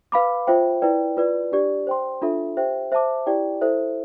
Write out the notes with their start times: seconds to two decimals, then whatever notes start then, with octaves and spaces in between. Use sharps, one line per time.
0.12 B4 F5 B5 D6
0.47 F4 C5 E5 G5
0.82 E4 B4 D5 G5
1.17 F4 B4 D5
1.52 D4 G4 D5
1.87 C5 G5 C6
2.22 D4 F4 A4 E5
2.57 G4 C5 E5 G5
2.92 C5 E5 A5 D6
3.26 E4 G4 D5 G5
3.61 E4 A4 C5 E5